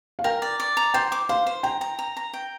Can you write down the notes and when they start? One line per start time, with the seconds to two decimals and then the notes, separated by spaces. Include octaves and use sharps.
0.19 F5
0.24 A#4 G5
0.42 D5
0.60 D5
0.77 A#5
0.94 C5 G5
1.12 D6
1.29 C5 F5
1.47 C5
1.63 G5 A#5
1.81 A#5
1.99 A#5
2.17 A#5
2.33 G5